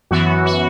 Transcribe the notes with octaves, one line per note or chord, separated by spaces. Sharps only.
F#2 E3 B3 F#4
F#4